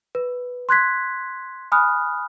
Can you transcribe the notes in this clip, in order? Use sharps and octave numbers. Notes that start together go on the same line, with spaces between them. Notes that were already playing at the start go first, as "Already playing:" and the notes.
B4
C6 F#6 G#6 B6
G#5 B5 D#6 F6 F#6